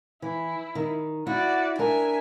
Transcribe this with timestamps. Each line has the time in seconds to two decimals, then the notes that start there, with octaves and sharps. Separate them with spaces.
0.22 E3 E4
0.75 D#3
1.27 E4 F#4 D5
1.79 D4 A#4 E5 G#5